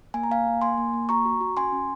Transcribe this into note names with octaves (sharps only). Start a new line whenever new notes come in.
A#3 G#5
A#5
A#3 F5 G#5
A#3
A#3 G#5 C6
A#3
A#3
F#4 A#5 C#6
F#4
F#4
C#4 G#5 C6
C#4